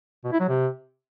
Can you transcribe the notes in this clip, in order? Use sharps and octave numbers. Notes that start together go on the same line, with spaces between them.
B2
E4
F#3
C3